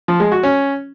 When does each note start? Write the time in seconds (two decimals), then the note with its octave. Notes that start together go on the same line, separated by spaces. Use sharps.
0.08 F3
0.20 G#3
0.32 F#4
0.43 C#4